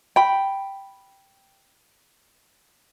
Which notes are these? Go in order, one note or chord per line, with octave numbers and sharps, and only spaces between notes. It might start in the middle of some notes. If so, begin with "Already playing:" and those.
G5 B5